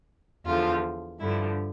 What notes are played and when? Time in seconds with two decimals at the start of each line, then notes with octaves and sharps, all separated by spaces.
0.46 E2 D3 F3 F4
1.20 G2 D3 F3 E4